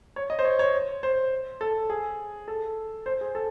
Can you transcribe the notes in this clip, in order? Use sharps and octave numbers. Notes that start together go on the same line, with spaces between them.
C#5
D#5
C5
C#5
C#5
C5
A4
G#4
A4
C5
G#4
A4